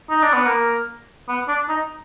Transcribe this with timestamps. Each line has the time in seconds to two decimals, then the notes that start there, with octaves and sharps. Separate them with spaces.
0.10 D#4
0.22 D4
0.33 B3
0.46 A#3
1.28 B3
1.48 D4
1.69 D#4